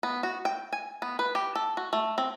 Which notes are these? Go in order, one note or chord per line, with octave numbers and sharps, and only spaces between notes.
B3
F#4
G5
G#5
B3
B4
G4
A4
F#4
A3
C4